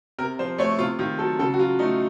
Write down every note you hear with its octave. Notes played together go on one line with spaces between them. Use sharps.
C3 A#4
F3 C5
A3 C#5
C3 F4
D#3 F4
F#3 A4
C#3 A4
F#4
F#3 F4
A3 D#4